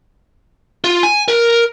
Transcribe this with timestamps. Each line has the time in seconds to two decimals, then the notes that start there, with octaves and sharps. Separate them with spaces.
0.84 F4
1.03 G#5
1.28 A#4